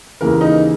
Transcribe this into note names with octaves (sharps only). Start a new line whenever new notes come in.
D#2 C#3 E3 A#4
D#4